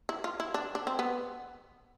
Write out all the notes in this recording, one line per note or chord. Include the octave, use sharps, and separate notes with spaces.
E4
F4
E4
D4
D4
C4
B3